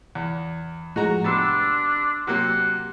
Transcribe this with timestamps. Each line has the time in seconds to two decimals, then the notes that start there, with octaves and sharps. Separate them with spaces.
0.15 E2
0.96 A2 F3 G#3 F#4 A#5
1.24 C3 B3 D4 C6 E6 A6
2.27 C3 F#3 A#3 F#5